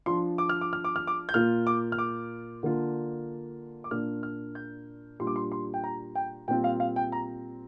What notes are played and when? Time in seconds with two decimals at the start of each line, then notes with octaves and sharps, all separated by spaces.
0.06 F3 D4 F4 C6
0.38 D6
0.49 F6
0.61 D6
0.73 F6
0.84 D6
0.96 F6
1.07 D6
1.29 G6
1.34 A#2 A#3 F4 F6
1.67 D6
1.92 F6
1.98 D6
2.63 D3 A#3 D4 F4
3.84 D6
3.91 A#2 A#3 D4 F4 F6
4.23 F6
4.55 G6
5.19 A#2 G3 D4 F4 C6
5.27 D6
5.36 C6
5.52 C6
5.74 G5
5.84 A#5
6.15 G5
6.48 A#2 G3 C4 F4 G5
6.64 F5
6.80 F5
6.96 G5
7.12 A#5